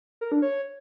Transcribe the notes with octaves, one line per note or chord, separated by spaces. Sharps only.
A#4
D4
C#5